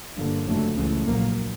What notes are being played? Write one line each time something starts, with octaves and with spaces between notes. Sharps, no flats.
G1 G2 D3 F3 A#3
F#1 F2 D3 F#3 A3
C#2 C#3 E3 A3
A#1 A#2 F#3 A#3